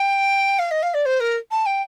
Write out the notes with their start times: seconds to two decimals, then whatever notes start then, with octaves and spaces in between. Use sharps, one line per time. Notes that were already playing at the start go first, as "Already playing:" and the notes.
Already playing: G5
0.58 F5
0.71 D#5
0.82 F5
0.94 D5
1.05 C5
1.20 A#4
1.51 A5
1.66 G5